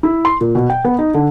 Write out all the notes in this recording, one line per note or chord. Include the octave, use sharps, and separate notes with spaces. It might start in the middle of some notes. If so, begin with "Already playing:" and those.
E4
C6
A#2
B2
G5
B3
D#4
D3